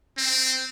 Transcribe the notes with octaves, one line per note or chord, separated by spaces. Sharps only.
C4